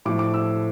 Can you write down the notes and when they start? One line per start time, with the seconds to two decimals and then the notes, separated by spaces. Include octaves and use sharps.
0.05 A2 F3 A3 D6
0.19 D6
0.34 E6